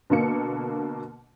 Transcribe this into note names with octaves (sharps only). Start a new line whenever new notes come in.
B2 D3 A#3 C#7